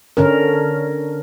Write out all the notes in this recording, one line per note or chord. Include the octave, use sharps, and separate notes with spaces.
D3 C#4 A#4